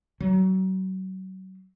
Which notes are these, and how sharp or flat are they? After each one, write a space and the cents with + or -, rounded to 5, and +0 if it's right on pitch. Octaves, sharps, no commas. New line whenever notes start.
F#3 +30